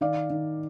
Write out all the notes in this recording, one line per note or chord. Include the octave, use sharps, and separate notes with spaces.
D#3 D5 F5
D#3